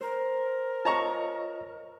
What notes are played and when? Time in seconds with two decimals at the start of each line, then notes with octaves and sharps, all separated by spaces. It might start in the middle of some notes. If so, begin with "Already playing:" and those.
0.01 A#4 C5
0.85 F4 C#5 D#5 A5 A#5 C#6